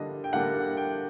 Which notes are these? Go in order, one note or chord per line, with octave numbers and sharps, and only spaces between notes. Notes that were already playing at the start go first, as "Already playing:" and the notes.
Already playing: D3 G3 A#3 D4 D#5
G5
D3 G3 A#3 D4 F#5
G5